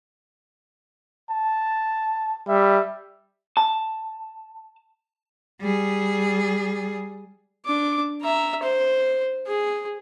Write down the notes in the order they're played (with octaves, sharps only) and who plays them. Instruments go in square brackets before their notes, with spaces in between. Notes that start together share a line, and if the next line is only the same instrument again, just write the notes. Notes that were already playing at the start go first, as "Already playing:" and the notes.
[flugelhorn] A5
[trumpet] G3 [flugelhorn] E5
[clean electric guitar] A5
[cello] G3 G#4
[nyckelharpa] D4 D6
E5 A#5
C5
G#4